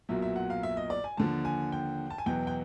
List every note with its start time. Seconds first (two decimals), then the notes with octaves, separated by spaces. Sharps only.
0.09 B1 A#2 F#3 E5
0.22 E5
0.36 F#5
0.50 F5
0.63 E5
0.77 D#5
0.90 D5
1.04 G#5
1.17 D#2 D3 F3 A5
1.45 G#5
1.72 G5
2.10 A5
2.18 G#5
2.26 E2 B2 F#3 G5
2.47 G5